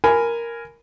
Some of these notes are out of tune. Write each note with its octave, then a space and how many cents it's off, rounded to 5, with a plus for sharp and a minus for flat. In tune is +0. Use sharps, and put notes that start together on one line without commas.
A#4 +0 G#5 +0 B5 +20